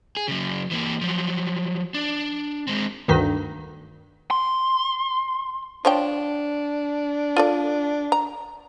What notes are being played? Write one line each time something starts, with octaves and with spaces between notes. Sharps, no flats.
G#4
C#3 F#3
E3 A#3
F3 F#3
D4
G#3 C4
D2 G2 D#3
C6
F3 D4 C#5 G5
F4 A4 D5
A#5